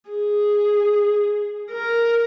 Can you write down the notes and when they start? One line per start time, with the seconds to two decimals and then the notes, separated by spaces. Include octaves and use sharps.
0.10 G#4
1.72 A#4